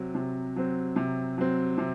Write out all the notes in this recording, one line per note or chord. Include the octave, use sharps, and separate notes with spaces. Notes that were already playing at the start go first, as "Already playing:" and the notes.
Already playing: C3 F#3 C4
C3
F#3 C4
C3
F#3 C4
C3